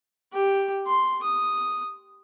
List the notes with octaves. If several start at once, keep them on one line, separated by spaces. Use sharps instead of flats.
G4
C6
D#6